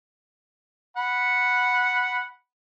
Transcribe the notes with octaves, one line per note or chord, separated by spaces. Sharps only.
F#5 B5